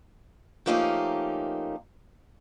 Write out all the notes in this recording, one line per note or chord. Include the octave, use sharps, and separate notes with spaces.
F3 A3 A#3 C#4 D#4 G4